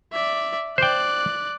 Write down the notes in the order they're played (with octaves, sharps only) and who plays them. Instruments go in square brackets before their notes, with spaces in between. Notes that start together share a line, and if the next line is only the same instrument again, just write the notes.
[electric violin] D5 E5
[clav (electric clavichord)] C5 G5 [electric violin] D5 F#6